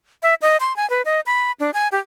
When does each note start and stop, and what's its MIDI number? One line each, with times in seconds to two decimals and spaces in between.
0.23 0.34 76
0.42 0.57 75
0.60 0.75 84
0.76 0.88 80
0.90 1.02 71
1.05 1.20 75
1.26 1.52 83
1.60 1.71 62
1.74 1.88 80
1.92 1.99 67